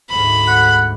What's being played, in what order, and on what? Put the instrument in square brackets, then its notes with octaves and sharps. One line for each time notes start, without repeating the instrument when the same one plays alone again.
[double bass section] D2 G#2 [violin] B5
[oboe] F#5